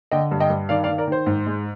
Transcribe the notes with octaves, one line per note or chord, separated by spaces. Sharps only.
D3 D#5 G5
G2
D#5 G5
G2
D#3 D5 F5
D5 F5
D#3
A#4 D5
D#3 C5
G#2
G#3